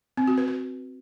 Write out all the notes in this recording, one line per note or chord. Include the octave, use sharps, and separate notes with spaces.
C4
F#4
B4
B4